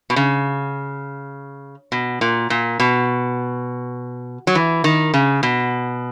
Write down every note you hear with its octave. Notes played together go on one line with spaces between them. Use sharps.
B2
C#3
B2
A#2
A#2
B2
F#3
E3
D#3
C#3
B2